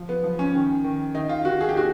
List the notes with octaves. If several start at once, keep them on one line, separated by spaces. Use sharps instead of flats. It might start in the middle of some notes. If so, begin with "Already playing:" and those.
Already playing: F3
B3
F3
C#4
D#3
D#3
D#3 D#4
F4
D#3 F#4
G#4
G4
A#2 F#4